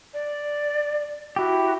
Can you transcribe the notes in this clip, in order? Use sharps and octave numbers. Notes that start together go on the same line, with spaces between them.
D5
E4 F#4 G4